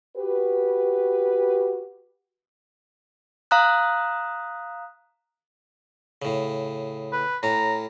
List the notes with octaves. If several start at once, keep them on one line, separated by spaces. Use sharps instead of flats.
F#4 G4 B4
F5 A#5 D#6 F#6
A2 C#3
B4
A2 C#4 A#5